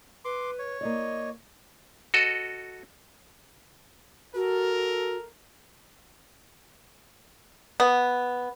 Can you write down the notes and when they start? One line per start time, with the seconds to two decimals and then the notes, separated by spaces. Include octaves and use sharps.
0.25 B4 C6 D6
0.59 C#5
0.81 A#3 E4 D5 D#5
2.14 F#4 A4 D#5
4.35 F#4 A4 A#4
7.80 B3